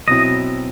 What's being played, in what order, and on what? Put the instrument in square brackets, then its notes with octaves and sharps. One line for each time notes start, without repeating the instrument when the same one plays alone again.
[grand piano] B2 F#3 C4 E4 [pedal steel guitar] D#5